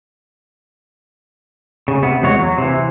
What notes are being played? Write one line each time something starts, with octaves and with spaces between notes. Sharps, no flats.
C#3
C3 B3
E2 G#3 F#4 C#5
F#3
C3 E3